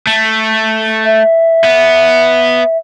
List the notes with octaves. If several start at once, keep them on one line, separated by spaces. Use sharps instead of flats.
A3
E5
B3